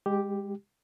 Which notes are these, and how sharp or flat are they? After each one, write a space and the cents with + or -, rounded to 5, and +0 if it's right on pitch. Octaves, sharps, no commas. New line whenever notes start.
G#3 -30 G4 +0